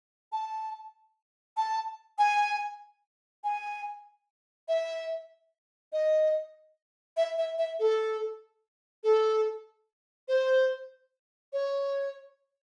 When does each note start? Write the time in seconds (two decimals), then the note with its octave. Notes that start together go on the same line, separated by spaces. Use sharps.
0.32 A5
1.57 A5
2.19 G#5
3.44 G#5
4.68 E5
5.93 D#5
7.17 E5
7.38 E5
7.58 E5
7.80 A4
9.04 A4
10.28 C5
11.53 C#5